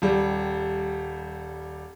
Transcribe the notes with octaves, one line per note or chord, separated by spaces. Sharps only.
D#1 G3